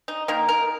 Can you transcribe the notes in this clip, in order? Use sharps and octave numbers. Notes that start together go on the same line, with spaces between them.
D#4
D#3 A#3 A#4
A#4